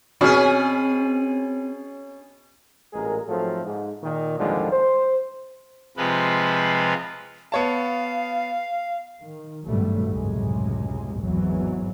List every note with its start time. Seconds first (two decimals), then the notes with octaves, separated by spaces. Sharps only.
0.21 B2 C4 C#4 G#4
2.93 A1 A#2 G#3 G#4 A#4
3.28 G#2 F3 F#3 A3 C4 A4
3.65 G#2
4.03 A#2 D#3
4.39 G#1 D#2 D3 F3 G3 G#3
4.72 C5
5.97 C3 F3 G#3 F4 B4
7.52 B3 C#5 F5 A5
9.22 D#3
9.66 G#1 G2 B2 F#3 G3 A3
10.10 C#2 F#2 A2 C3 G#3
11.20 G#1 E2 G#2 E3 F#3